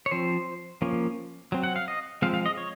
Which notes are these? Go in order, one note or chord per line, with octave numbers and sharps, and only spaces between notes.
C#5
F3 C4 C5
F3 A#3 C#4
F#3 C4
F#5
F5
D#5
F3 G#3 C4 F5
F5
D#5
C#5